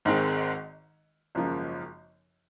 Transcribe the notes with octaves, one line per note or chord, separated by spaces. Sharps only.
G#1 G#2 D#3 G#3 C4
G#1 F#2 C#3 F3 A#3